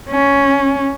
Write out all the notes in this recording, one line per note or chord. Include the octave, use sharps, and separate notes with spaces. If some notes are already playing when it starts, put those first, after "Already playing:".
C#4